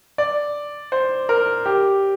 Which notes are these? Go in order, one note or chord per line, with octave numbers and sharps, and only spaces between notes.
D5
C5
A#4
G4